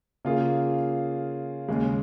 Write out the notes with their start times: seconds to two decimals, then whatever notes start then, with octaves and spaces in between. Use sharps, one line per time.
0.25 C#3 A#3 F4 G#4
1.68 D#2 C#3 G#3